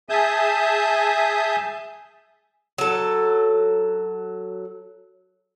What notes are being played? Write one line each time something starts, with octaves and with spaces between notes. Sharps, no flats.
G#4 E5 G#5 A5 D#6 G6
F#3 A4